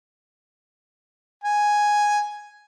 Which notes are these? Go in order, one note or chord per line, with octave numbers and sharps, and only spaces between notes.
G#5